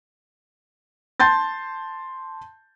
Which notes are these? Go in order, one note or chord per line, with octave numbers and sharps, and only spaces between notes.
A5 C6 G6 A6